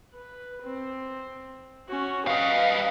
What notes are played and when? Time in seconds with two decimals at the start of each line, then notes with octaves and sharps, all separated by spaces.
0.14 B4
0.63 C4
1.89 C#4 F#4
2.27 G3 B4 D#5 F5